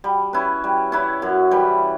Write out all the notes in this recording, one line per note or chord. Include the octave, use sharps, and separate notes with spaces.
G3
C#4 E4 B4
G3
C#4 E4 B4
F#2
E3 G3